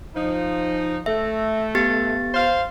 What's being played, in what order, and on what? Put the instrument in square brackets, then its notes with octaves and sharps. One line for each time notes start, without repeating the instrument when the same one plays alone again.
[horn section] F3 D#4
[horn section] A3 [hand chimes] E5
[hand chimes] B3 G4 A6
[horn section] C5 F5